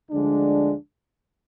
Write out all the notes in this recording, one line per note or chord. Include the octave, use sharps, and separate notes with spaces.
D2 D3 F3 G#3 D4